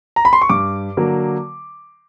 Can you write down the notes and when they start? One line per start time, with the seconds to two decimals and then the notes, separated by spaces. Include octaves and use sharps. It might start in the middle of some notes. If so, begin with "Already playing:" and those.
0.16 A#5
0.25 B5
0.33 C6
0.42 C#6
0.49 G2 D6
0.97 D3 F#3 A#3